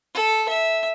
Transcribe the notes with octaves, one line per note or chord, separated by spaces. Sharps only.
A4
E5